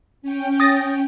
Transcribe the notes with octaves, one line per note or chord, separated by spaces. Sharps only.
C#4 G5
D#6 A6 A#6